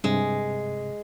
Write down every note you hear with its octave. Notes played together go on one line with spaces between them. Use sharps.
G2 C3 G#3